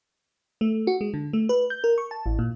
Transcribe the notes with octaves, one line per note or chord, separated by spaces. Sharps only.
A3
F#4
G#3
D3
A3
B4
G6
A#4
C#6
A5
A1
A#2